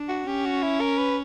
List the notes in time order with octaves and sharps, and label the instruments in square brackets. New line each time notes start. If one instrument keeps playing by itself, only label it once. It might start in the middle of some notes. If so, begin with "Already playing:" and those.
Already playing: [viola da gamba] D4
[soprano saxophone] F#4
[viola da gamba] C#4 [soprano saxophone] G4
[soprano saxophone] F#4
E4
A#4
B4